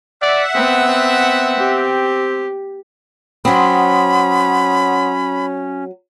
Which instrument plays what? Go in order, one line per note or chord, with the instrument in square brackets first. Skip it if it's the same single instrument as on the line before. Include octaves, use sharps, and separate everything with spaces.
[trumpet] D5 [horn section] E5 F#5
[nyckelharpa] B3 [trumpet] C4
[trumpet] C4
[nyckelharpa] G4
[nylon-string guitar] F#3 C4 [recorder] C#4 [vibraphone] F#5 C6 D#6 [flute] B5